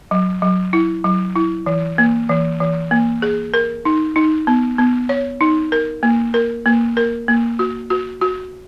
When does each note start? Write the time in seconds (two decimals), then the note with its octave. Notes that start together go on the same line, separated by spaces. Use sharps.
0.11 F#3
0.42 F#3
0.73 E4
1.04 F#3
1.36 E4
1.66 E3
1.98 A#3
2.29 E3
2.60 E3
2.91 A#3
3.22 G#4
3.54 A#4
3.85 D#4
4.16 D#4
4.47 B3
4.78 B3
5.09 C#5
5.41 D#4
5.72 A#4
6.03 A#3
6.34 A#4
6.66 A#3
6.97 A#4
7.28 A#3
7.59 F#4
7.90 F#4
8.21 F#4